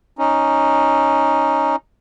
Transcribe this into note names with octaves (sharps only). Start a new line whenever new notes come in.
C#4 D#4